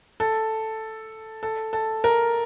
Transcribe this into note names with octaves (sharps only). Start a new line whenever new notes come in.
A4
A4
A4
A#4